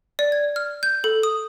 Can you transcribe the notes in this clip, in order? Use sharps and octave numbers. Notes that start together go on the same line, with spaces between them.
D5
G#6
F6
G6
A4
D#6